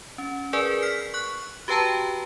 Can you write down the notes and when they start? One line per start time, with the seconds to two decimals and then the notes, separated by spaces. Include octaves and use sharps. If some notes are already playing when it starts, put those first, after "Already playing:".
0.18 C#4
0.53 G#4 A#4 B4 D5 G#5
0.82 F6 B6 C7
1.14 C#6 F#6
1.68 F#4 G4 B4 G5 A5 A#5